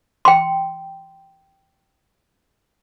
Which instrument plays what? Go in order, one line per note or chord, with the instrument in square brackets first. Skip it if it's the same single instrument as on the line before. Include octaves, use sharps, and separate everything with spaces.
[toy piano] G5 C6